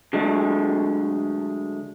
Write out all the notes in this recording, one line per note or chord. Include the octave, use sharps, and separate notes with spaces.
D3 F#3 G#3 A3 D4